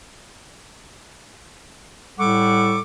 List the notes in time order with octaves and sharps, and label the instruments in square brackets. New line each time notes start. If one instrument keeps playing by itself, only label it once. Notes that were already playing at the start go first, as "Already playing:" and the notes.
[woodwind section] A2 G3 A4 F#5 C#6 D6